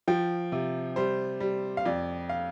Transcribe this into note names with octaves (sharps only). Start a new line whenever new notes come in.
F3 G5
C3
G3 C5
G3
F5
F2 D5
F5